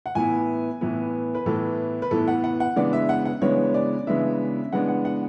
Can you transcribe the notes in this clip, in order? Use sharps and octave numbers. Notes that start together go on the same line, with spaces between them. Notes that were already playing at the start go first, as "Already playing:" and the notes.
F#5
A2 E3 B3 E4 G#5
A2 E3 B3 E4
B4
A2 E3 B3 E4 A4
B4
A2 E3 B3 E4 A4
F#5
F#5
F#5
C#3 E3 G#3 B3 D4 D5
E5
F#5
F#5
C#3 E3 G#3 B3 D4 C#5
D5
C#3 E3 G#3 B3 D4 E5
C#3 E3 G#3 B3 D4 F#5
F#5
F#5